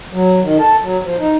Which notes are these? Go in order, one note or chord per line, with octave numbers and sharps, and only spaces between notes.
F#3
D#3
A4
F#3
F3
D#4